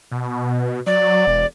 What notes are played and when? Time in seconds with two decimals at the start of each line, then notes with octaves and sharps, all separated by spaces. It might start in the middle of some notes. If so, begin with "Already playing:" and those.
0.12 B2
0.87 F#3 D5
1.27 E1